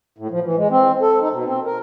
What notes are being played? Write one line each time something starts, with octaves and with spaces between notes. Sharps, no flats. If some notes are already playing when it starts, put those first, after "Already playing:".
A2
F3
E3
G#3
C4
A4
D#4
B2
C4
A#4